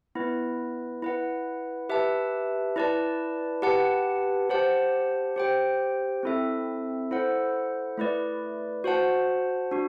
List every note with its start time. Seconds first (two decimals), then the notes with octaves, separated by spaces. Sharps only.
0.15 B3 E4 B4
1.02 E4 B4 F#5
1.89 G4 B4 E5 A5
2.76 E4 B4 D5 A5
3.62 G4 B4 F#5 A5
4.49 G4 C5 F#5 A5
5.36 G4 C5 G5
6.23 C4 E4 A4 E5
7.11 E4 A4 C5 F#5
7.98 A3 E4 B4 D5
8.84 F#4 C5 F#5 A5
9.71 D4 F#4